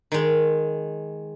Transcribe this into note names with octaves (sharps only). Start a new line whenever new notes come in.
D#3 G#3